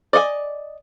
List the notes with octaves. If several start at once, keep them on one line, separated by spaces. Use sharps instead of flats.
D5 D#5 F#5 G#5